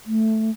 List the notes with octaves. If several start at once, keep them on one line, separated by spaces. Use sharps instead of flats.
A3